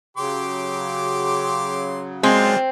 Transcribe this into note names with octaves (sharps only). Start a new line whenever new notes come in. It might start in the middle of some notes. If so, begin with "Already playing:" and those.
C#3 F#3 G4 C6 D6
G#3 A#3 C4 D4 F4